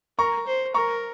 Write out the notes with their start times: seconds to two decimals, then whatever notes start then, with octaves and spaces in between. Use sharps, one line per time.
0.18 A#4 A#5 C#6
0.46 C5
0.74 A#4 A#5 C#6